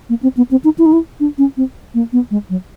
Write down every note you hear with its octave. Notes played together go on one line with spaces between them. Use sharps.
A#3
C4
B3
C4
D#4
E4
D#4
E4
D4
C#4
C4
A#3
B3
G#3
F#3